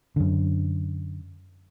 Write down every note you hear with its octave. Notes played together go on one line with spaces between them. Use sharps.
F#2 D3